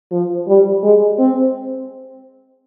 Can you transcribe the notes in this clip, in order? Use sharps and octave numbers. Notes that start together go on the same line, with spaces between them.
F3
G3
G#3
C4